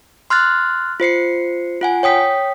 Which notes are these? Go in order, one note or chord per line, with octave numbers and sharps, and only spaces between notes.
C6 F6 F#6 A6
F4 C5 C7 C#7
F4 F#5 G#5
C#5 G5 D#6 B6